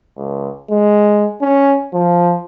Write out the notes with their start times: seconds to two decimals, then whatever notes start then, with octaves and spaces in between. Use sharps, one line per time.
0.17 C#2
0.70 G#3
1.42 C#4
1.93 F3